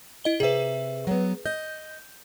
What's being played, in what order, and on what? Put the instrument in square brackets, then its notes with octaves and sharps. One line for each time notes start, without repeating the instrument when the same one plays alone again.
[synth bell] E4 D#5 G7
[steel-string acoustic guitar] C3 E5 [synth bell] G#4 B4
[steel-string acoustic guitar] F#3 B3
[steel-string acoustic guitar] D#5 [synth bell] G6